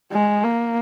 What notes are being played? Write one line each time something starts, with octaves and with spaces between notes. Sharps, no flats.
G#3
A#3